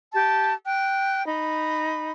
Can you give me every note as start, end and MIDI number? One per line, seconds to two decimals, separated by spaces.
0.12 0.53 67
0.12 0.53 81
0.65 1.25 79
0.65 1.25 90
1.26 2.11 63
1.26 2.11 83